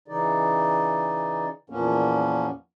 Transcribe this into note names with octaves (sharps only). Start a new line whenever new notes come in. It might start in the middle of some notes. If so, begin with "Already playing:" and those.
C#3 E3 D#4 D5
E2 A#2 F3 A#3 B3 C#4